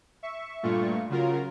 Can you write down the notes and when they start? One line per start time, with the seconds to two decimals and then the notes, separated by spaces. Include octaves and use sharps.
0.23 E5 C#6
0.63 G2 A#2 A3 F4 C#6
1.10 C#3 F#3 F4 A#4